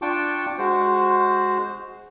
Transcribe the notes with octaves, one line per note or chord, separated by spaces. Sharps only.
D4 F4 G5 A5 C#6 D6
G#3 F#4 C5